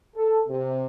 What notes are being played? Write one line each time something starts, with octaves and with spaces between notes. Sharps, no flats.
A4
C3